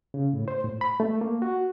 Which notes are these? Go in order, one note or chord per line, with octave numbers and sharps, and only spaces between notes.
C#3
A2
C5
A2
B5
A3
A#3
F#4